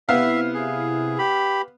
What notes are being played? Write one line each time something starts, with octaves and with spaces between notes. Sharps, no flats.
C3 B3 E4 E5 F5
G#4
G4 B5